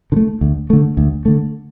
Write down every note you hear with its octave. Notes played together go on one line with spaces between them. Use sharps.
D3
A3
D2
D3 A3
D2
D3 A3